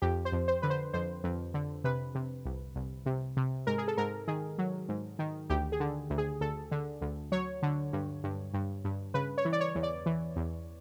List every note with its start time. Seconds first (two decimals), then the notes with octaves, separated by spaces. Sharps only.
0.02 F2 G4
0.25 C5
0.32 F2
0.48 C5
0.62 D3 B4
0.70 C5
0.93 F2 C5
1.24 F2
1.54 D3
1.84 C3 B4
2.15 C3
2.45 C2
2.76 C2
3.06 C3
3.37 C3
3.67 G#2 A#4
3.78 G#4
3.88 A4
3.97 G#2 A#4
4.28 D#3 G#4
4.58 F#3
4.89 G#2
5.19 D#3
5.50 D2 G4
5.72 G#4
5.80 D3
6.10 D2
6.18 G#4
6.41 D2 A4
6.71 D3
7.01 D2
7.32 F#3 C#5
7.62 D3
7.93 G2
8.24 G2
8.54 G2
8.84 G2
9.14 C#3 B4
9.38 C#5
9.45 E3
9.52 D5
9.60 C#5
9.75 E2
9.83 D5
10.06 E3
10.36 E2